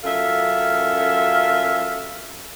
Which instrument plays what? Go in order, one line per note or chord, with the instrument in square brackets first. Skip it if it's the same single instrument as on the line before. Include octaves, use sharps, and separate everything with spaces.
[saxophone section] F#2 F4 A4 E5